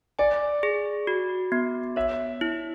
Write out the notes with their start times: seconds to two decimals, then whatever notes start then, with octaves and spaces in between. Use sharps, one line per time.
0.19 D5 G#5
0.63 G#4
1.07 F#4
1.52 B3
1.96 C#5 E5
2.41 E4